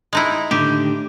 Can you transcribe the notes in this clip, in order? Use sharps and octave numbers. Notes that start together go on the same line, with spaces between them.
G#3 D#4 E4
A2 D3 D#3 G4